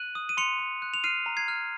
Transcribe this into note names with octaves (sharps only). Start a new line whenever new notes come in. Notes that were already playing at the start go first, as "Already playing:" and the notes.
Already playing: F#6 D#7 F#7
D#6
D#7
C6 C#7 F7
C6
F#6
F7
F6 C7 D#7
A#5
G#6 C7
F6